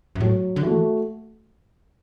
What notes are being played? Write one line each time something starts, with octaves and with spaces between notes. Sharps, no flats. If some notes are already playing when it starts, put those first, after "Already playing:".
F#2
A2 F#3
D3
E3 A3 F#4